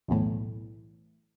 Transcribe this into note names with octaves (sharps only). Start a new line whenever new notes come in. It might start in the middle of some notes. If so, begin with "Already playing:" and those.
B1 E2 A2